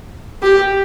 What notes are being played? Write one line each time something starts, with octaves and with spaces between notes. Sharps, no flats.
G4